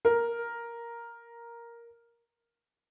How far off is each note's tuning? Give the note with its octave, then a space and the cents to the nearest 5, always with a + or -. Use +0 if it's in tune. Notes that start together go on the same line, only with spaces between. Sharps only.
A#4 +5